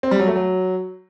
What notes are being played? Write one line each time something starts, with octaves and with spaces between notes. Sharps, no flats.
C4
G3
F#3
A3
F#3